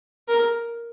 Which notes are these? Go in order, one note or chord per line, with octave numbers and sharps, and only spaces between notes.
A#4